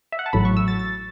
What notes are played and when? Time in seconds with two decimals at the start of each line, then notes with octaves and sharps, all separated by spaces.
0.12 E5
0.19 F#5
0.26 A5
0.33 A1 A2 F#3 B5
0.45 C#6
0.57 E6
0.68 A6
0.79 A6